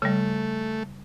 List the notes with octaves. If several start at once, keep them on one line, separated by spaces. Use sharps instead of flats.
C#3 G3 A3